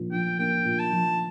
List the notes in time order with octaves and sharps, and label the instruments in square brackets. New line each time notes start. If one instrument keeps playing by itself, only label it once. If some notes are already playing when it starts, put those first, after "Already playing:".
Already playing: [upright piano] A#2 F3
[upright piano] F3 [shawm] G5
[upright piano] A#3 [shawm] G5
[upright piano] A#2
[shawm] A5
[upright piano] F3